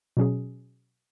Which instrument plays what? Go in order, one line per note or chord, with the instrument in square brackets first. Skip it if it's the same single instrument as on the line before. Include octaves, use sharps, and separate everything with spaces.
[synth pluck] B2 F#3 C#4 G#4